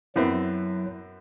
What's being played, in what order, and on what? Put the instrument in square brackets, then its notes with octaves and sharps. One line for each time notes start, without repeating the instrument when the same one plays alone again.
[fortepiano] F#2 B3 C4 [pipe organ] F#3 [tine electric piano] E4